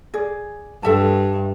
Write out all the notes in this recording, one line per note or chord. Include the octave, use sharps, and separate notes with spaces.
G#4 D5
G2 A4 E5 A5